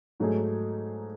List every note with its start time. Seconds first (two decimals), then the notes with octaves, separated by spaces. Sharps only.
0.20 G#2 F#3 A3 D#4 G#4